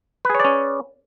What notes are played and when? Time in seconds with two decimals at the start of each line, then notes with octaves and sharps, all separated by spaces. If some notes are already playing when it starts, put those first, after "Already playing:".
0.25 B4
0.30 G#4
0.35 C#5
0.40 D5
0.45 C#4